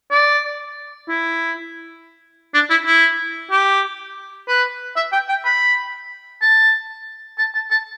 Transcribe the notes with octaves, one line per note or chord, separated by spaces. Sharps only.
D5
E4
D4
E4
E4
G4
B4
E5
G5
G5
B5
A5
A5
A5
A5